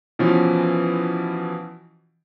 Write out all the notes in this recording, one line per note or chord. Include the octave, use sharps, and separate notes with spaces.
B2 E3 F3 C#4